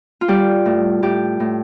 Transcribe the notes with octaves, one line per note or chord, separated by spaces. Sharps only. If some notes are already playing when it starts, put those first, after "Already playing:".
F4
G3 G4
A2
A2 G4
A2